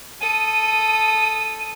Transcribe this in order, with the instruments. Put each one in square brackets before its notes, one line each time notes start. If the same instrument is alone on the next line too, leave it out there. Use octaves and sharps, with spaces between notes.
[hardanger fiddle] A4 D#6 [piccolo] D#7